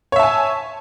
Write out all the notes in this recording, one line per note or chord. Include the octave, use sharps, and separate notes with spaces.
C#5 E5 G#5 A5